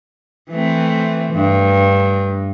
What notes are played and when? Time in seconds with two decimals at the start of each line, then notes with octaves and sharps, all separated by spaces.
0.50 E3 A3 C4
1.33 G2